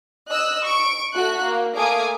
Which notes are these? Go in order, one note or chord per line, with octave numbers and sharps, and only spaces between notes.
D#5 E6 F#6
C#6 D7
A3 F#4 F#6
A#3
A3 A#3 F5 G#5 D6 D#6